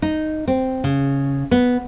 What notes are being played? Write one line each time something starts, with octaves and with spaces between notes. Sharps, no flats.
D#4
C4
C#3
B3